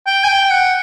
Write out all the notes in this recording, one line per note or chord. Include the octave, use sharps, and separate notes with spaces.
G5
G#5
G5
F#5